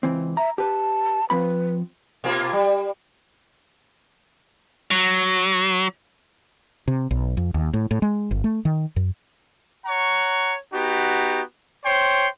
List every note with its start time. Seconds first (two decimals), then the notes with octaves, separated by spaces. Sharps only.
0.03 C#2 E3 C4
0.37 E5 A#5
0.58 G4 B4 A5
1.30 F3 C4 B4 B5
2.24 B2 A#3 F4
2.53 G3
4.91 F#3
6.88 C3
7.11 B1
7.37 F2
7.54 D#2
7.74 A2
7.91 A2
8.02 G#3
8.31 G1
8.44 A3
8.65 D#3
8.96 F#2
9.86 C#5 F#5 A#5 C#6
10.73 B3 D#4 F#4 G4
11.85 C5 C#5 G5 C6